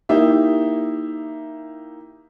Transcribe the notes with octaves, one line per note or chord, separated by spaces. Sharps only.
A#3 D#4 E4 G4 E5